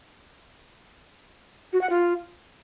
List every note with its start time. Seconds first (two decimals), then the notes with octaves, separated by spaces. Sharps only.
1.73 F#4
1.81 F#5
1.90 F4